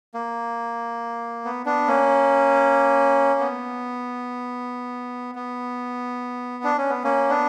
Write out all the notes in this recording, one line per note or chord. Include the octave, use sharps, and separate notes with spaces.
A#3
B3
B3 D4
A#3 C#4
B3
B3
D4
C#4
B3
A#3 C#4
B3 D4